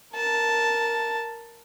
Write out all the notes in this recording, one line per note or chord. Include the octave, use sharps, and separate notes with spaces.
A#4 A5